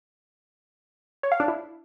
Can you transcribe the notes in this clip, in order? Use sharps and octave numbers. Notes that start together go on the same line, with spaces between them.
C#5
F5
D4
E4